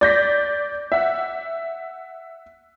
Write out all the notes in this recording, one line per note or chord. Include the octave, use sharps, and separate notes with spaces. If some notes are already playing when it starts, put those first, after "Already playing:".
D5 G6 A#6 B6
E5 F#5